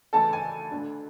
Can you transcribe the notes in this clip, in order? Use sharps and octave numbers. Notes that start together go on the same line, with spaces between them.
D2 C#3 E3 A4 A5
G#5
D2 D3